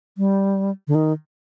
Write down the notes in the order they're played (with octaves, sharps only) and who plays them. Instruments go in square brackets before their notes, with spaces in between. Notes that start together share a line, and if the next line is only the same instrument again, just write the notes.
[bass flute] G3
D3
D#3